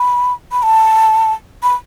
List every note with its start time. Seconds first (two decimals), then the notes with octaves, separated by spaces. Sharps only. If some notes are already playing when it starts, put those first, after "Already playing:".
Already playing: B5
0.52 B5
0.63 A5
1.63 B5